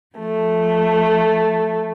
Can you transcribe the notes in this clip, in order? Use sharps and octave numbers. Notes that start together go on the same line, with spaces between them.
F3 A3